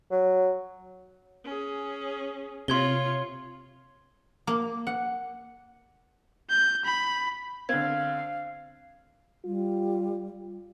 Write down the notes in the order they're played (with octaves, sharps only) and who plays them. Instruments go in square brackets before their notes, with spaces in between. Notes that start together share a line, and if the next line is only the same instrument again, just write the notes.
[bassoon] F#3
[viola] C#4 G#4
[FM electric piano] C3 [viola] F4 C#5 [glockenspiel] C6 G#6 G7
[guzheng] A#3
F#5
[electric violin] G6
B5
[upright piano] D3 C4 [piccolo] F5 [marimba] G#6
[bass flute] G3 [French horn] F4